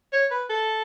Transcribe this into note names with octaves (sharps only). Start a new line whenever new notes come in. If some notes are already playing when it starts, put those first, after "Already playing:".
C#5
B4
A4